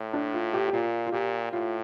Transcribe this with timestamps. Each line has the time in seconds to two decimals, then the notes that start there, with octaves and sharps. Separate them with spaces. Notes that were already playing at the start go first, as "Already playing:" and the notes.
Already playing: A2
0.13 D4
0.33 F4
0.54 G4
0.68 G4
0.73 A#2 F4
1.06 F4
1.12 A#2 G4
1.53 A2 F4